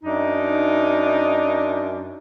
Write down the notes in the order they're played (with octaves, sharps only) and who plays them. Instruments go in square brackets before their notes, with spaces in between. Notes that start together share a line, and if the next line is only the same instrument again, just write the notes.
[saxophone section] F#2 D4 D#4